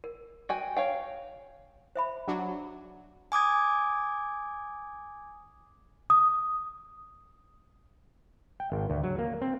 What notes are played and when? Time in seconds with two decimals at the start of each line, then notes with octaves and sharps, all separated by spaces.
0.04 A#4
0.49 F#4 G5 G#5
0.77 C#5 F5 G5
1.96 C5 E5 B5
2.28 F#3 D4 F#4
3.32 G#5 D6 D#6 G#6
6.10 D#6
8.60 G5
8.72 G#1
8.90 D2
9.04 F#3
9.19 A#3
9.42 C4